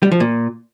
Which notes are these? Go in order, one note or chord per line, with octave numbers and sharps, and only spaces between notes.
G3
F3
A#2